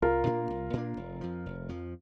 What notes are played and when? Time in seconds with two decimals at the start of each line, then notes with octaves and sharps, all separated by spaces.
0.02 C2 F4 A#4
0.26 A#2 A#3 D4
0.50 C2
0.73 A#2 A#3 D4
0.97 F1
1.21 F2 F3
1.46 F1
1.69 F2 F3